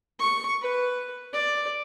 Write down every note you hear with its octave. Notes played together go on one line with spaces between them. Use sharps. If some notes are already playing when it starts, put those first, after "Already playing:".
C#6
B4
D5